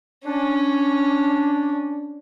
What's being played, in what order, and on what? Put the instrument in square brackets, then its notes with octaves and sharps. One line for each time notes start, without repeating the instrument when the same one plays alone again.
[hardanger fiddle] C#4 [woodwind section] D4